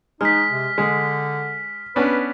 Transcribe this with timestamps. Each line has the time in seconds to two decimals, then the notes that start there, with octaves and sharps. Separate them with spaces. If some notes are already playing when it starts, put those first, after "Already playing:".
0.21 G#3 D#4 F6 B6
0.50 C3
0.78 D3 G#3
1.96 B3 C#4 D4 B4